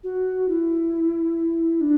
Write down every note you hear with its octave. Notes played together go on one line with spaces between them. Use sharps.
F#4
E4
D4